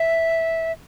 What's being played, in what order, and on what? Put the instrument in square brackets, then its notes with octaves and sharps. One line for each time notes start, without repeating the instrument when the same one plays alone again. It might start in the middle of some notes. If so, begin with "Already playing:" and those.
Already playing: [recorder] E5